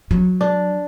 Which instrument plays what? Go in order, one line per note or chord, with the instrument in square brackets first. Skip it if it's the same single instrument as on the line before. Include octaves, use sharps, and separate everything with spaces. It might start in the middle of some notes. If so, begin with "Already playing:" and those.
[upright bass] F#3
[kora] D4